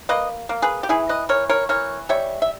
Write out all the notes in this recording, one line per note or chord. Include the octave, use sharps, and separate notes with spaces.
A#3 B4 D#5
A#3
G#4 B4
G4
E3 E4 G#4
B4 D#5
E3 A#4 C#5
A#4 C#5
E3 A#4 C#5
G3 C#5 E5
E5